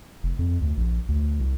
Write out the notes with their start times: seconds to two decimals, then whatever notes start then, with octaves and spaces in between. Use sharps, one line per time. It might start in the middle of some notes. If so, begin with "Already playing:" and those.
0.23 F1
0.39 F2
0.61 D2
0.77 A#1
1.08 D2
1.40 C2